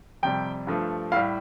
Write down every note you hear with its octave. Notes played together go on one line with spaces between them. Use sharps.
F2 C3 G3 G5
G2 F3 A3
A2 G3 F5